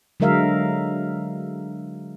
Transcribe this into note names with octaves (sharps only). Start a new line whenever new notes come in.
D3 F#3 G#3 A#4 E5 F5